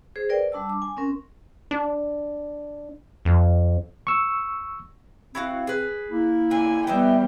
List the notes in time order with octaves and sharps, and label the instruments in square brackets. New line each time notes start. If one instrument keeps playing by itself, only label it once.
[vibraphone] G#4 C5
A#4 B4 D5 G5
G3 D4 A5 E6
D6
G#5
C4 C#4 A#4
[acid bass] D4
F2
[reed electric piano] C#6 E6
[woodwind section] C4 [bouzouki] E4 F#4 F5
[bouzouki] G#4 B4
[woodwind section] A#3 E4
[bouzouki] D3 [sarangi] G#5
[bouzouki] E3 D#4 E5 [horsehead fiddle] G3 B3 [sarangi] G5